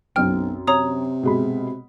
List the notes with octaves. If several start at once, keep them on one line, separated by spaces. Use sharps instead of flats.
B1 F#2 C4 G5 F6
C3 C#5 A#5 D#6
B2 G#3 B5